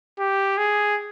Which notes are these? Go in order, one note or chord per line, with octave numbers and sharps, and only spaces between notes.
G4
G#4